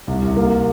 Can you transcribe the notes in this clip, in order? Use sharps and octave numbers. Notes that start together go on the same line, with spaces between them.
C2
C2
A#3